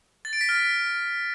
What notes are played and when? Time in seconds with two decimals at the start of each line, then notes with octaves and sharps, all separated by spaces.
0.25 A6
0.33 D7
0.41 B6
0.49 F6